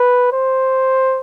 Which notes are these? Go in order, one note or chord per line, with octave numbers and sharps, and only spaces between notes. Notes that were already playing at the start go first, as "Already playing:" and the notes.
Already playing: B4
C5